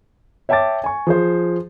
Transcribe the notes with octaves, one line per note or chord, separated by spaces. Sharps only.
C#5 E5 G5 A5 D6 A6
G#5 C#6
F3 G#4 C5